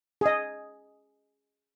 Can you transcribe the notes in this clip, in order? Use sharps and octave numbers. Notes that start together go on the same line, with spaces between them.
G#4 D#5